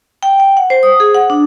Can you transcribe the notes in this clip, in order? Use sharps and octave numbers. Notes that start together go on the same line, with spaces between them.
G5
G5
F#5
C5
D#6
G#4
F#5
D4